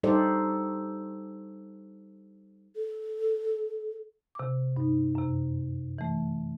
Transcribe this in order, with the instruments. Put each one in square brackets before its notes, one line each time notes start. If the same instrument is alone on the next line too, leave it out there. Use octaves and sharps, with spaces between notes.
[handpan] G3 D#4 G4 A4 C5 D5
[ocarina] A4
[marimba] C3 D6
G2 D#4
F#2 C3
E3 A3